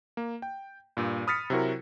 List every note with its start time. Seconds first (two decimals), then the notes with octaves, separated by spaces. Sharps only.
0.17 A#3
0.42 G5
0.97 G2 A#2
1.27 B5 D#6 F6 A6 B6 C#7
1.50 C3 F#3 E4 F#4 A#4